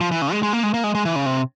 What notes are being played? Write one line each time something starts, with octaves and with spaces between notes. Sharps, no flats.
F3
E3
C#3
G#3
G#3
A#3
G#3
A#3
G#3
G#3
E3
C#3
C3